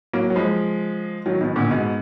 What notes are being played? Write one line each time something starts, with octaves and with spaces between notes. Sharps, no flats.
F#3 A#3
F#3
F3 G#3
D#3 F#3
B2 D#3
A#2 D3
G#2 B2